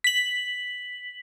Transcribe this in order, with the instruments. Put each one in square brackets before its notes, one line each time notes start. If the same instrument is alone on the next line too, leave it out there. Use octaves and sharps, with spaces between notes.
[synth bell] B6 F#7